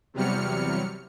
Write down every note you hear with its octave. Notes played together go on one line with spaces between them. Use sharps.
E2 C3 F#3 G3 F6 C#7